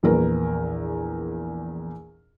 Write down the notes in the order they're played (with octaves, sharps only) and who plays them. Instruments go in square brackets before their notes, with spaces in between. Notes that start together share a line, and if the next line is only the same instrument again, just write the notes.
[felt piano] A#1 E2 A#4 B4